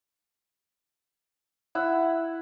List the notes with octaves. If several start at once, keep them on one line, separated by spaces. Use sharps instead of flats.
E4 F#5 E6